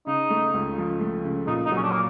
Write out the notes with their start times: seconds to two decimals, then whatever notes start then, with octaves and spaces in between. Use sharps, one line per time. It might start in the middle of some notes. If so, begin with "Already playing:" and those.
0.07 C#3 D#4
0.30 A3
0.54 C#2
0.78 F3
1.01 A3
1.25 C#3
1.47 A#2 D#4
1.65 D#4
1.72 F#3
1.77 C#4
1.83 D4
1.92 A#3